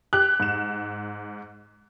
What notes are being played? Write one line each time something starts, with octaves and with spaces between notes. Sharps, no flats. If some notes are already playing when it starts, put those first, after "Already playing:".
G4 F#6
G#2 E7